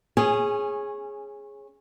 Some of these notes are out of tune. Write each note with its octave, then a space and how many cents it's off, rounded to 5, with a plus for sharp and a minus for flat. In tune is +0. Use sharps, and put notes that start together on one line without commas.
C#4 -20 G#4 +0